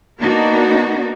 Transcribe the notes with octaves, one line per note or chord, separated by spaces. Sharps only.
A#3 B3 D4 D#4 F#4 A#4